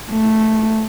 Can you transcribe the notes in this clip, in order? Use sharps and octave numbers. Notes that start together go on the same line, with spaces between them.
A3